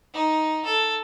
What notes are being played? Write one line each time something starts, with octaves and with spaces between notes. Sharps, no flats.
D#4
A4